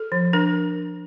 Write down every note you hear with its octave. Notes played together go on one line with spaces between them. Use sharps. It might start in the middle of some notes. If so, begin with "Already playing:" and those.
Already playing: A4
F3
D4 A#4